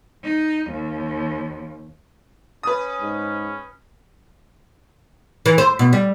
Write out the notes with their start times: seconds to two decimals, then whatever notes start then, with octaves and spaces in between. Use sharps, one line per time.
0.24 D#4
0.71 D#2
2.63 C#4 B4 D#6
3.01 G#2
5.46 E3
5.58 C5
5.79 B2
5.93 G3